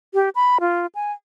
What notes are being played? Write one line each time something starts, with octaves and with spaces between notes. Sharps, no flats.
G4
B5
F4
G#5